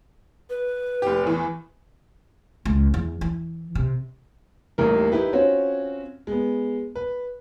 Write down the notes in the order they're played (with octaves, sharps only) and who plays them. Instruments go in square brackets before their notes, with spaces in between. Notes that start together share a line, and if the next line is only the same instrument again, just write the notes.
[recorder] B4
[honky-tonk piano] F1 G4
E2 E3
[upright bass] C#2
E2
E3
C3
[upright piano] D#1 A1 D#2 E4 A#4
D#4 E4 G4 B4
C4 C#4 F4 F#4 C#5
G#3 B3
B4